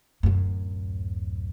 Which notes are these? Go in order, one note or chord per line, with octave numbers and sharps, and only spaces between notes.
D1 F#2